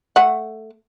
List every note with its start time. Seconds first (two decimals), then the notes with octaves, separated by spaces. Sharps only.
0.16 A3 F#5